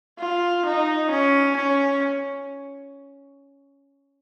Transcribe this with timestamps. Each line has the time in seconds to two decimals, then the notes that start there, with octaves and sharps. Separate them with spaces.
0.19 F4
0.65 D#4
1.10 C#4
1.56 C#4